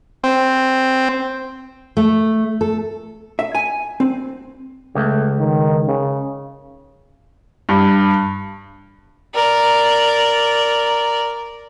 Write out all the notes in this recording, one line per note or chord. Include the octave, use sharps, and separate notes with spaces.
C4
A3
A4
E5
G#5
C4
C#2 A3
D#3
C#3
G2
A#4 D5